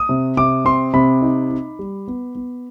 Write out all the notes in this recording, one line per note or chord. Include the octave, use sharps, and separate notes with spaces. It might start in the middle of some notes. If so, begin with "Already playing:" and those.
Already playing: D#6
C3
C3 D6
C4 C6
C3 B5
D#4
D#4
G3
B3
B3